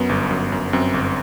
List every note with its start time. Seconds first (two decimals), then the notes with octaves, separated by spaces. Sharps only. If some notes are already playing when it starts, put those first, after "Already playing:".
Already playing: F#2 B3
0.09 G1
0.31 F#2
0.52 F#2
0.73 F#2 C4
0.94 G1